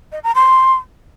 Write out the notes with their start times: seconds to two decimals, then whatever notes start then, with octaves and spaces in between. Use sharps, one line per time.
0.12 D#5
0.24 A#5
0.35 C6